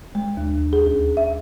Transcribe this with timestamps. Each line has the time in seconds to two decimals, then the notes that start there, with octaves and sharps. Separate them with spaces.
0.15 G#3
0.37 D#2
0.73 G#4
0.86 D2
1.17 E5